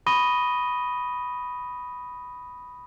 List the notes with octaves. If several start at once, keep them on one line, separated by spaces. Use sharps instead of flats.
B5 C#6 D#6 A#6 D#7 G7